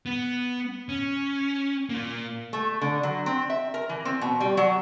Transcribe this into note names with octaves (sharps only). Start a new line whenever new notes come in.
B3
C#4
A#3 F4
A3
D3
F#3
C4
E5
A#4
E3
C4
B2
G3
F#3